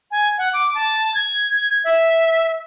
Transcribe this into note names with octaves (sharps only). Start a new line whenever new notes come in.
G#5
F#5
D6
A5
G#6
E5